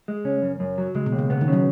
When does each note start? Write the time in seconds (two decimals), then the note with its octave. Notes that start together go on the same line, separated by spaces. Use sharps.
0.08 G#3
0.25 C#3 C#4
0.42 F#2
0.60 F#2
0.78 F#3
0.95 C#3 G#3
1.06 B2
1.12 D#2
1.19 C#3
1.30 C#3 B3
1.41 D#3
1.48 C#3 F#3